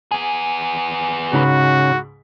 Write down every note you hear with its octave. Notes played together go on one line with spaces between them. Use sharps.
B3 G#4 G#5
C#2 G#2 C#3 F#4 B5